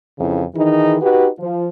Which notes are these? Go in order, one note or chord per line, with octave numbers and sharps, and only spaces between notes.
F2 C#3 E3
D#3 E3 D#4 G#4
D#4 F#4 G4 B4
F3